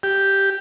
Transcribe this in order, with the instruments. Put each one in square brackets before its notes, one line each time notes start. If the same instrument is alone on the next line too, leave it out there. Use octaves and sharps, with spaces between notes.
[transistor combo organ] G4